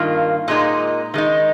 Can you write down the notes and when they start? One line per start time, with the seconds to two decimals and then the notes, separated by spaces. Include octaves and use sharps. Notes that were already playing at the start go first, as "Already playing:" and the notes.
Already playing: G2 D#3 A#3 F4
0.48 A#2 G#3 D#4
1.14 D#3 G#3 D#4